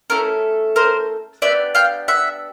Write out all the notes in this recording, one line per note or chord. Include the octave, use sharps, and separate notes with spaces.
A3 C#4 E4 A4 A#4
A#4 C5
B3 D4 G4 D5 E5
F5 G5
E5 F#5